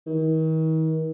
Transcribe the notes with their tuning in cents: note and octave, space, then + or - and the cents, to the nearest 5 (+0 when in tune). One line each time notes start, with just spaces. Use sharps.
D#3 +40